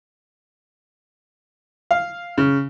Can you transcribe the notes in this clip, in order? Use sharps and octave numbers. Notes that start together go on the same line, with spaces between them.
F5
C#3